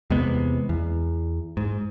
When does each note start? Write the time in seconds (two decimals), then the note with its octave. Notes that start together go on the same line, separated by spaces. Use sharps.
0.10 E2 C3 G#3 B3
0.69 E2
1.57 G#2